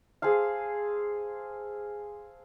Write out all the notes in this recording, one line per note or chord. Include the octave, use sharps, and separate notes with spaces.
G#4 A4 C5 F5